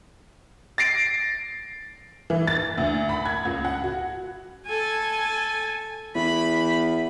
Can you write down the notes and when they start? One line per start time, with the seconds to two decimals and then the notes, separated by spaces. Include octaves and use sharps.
0.78 A6 A#6 C7 D7
2.30 E3
2.47 A6
2.78 D2
3.09 B5
3.26 G#6
3.45 C#2
3.65 F#5
3.84 F#4
4.67 A4 G#5
6.16 E2 B5